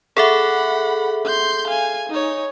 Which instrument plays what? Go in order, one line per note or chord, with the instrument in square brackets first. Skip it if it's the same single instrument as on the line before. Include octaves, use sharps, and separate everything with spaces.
[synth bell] G#4 A4 E5 [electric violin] F#5 B5
[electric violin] C6 G6
F5 G#5
D#4 C#5